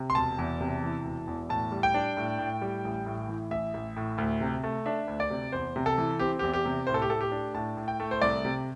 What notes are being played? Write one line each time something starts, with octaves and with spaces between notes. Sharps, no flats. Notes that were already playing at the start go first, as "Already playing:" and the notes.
Already playing: C3
C6
E1 A5
E2
C3
E3
E1
E2
A2 A5
G3
G5
D4
A2
A2
G3
A1
A2
E3
A1 E5
A1
A2
D2
C3
A3
D4 E5
D2
D5
C3
E2 C5
C3
A4
E3
C4 G4
E2 G4
G4
C3
A2 C5
A4
G4
A3 A4
G4
D4
A2 A5
A2
G5
A3
C5
C2 D5
C3